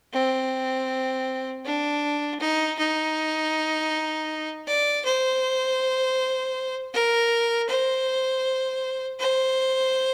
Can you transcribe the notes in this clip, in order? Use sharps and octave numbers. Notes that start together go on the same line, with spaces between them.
C4
D4
D#4
D#4
D5
C5
A#4
C5
C5